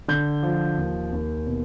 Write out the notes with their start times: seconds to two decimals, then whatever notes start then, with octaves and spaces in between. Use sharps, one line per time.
0.08 D3 G6
0.43 F3
0.78 D#2
1.12 D#2
1.47 B2